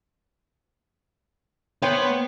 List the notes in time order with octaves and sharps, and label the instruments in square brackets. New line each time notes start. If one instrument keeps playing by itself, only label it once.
[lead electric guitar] B3 [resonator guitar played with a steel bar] C5 C#5 G5